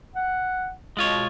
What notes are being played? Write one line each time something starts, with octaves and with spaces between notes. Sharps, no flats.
F#5
B2 G#3 F4 C#5